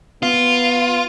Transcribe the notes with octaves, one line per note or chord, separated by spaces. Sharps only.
B3 F4